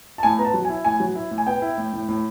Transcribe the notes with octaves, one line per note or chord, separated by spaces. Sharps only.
A5
A2 G#5
B3 A#5
A5
F#3
G#5
E4
A2 G#5
F#3
E4
A2
G#5
B3 G5
E4
A2
A2
A2